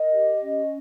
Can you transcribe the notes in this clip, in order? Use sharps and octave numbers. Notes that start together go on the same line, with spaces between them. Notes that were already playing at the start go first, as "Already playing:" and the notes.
Already playing: A#4 D#5
G4
C#4